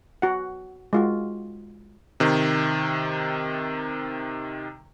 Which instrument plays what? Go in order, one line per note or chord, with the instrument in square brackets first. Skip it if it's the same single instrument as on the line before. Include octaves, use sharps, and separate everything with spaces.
[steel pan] F#4 F#5
G#3 F4 F#4
[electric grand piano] C3 D#3